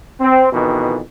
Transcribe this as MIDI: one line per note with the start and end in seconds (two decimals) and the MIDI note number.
0.19 0.47 60
0.51 1.00 41
0.51 1.00 47
0.51 1.00 51
0.51 1.00 52